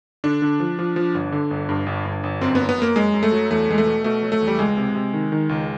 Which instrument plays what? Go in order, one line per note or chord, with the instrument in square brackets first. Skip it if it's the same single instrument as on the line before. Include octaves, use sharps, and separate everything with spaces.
[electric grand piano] D3 D4
D3
F3
F3
F3
G1
D3
G1
G2
G1
G1
G1
F#2 C4
F#2 B3
B3
F#2 A#3
F#2 G#3
F#2
A3
F#3
E2 A3
E2 G#3
A3
B2
B2 A3
F#3
A3
E2
G3
C#2 G#3
C3
C3
D#3
D#3
C#2